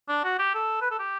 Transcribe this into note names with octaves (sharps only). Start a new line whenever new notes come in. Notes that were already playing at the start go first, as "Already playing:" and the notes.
D4
F#4
G4
A4
B4
A4
G4